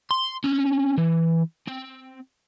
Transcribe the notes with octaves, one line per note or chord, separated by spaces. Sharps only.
C6
C4 C#4
E3
C4